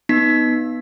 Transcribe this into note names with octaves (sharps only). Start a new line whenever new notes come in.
B3 D#4 B6